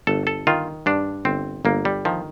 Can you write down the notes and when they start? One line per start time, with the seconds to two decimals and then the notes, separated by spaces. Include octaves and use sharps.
0.07 G1 A4
0.27 A4
0.47 D#3 F4
0.86 G2 D4
1.25 G1 C4
1.65 G1 A#3
1.85 G3
2.05 D#3 F3